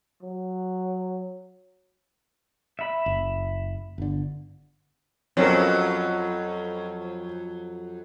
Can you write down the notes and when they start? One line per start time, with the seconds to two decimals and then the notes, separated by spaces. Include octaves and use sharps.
0.23 F#3
2.79 E5 B5
3.06 F#1
3.98 G1 D3
5.37 F2 F#3 C4 C#4 A#4